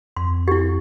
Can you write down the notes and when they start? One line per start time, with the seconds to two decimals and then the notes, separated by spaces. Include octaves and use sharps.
0.17 F2 C6
0.48 E4 G4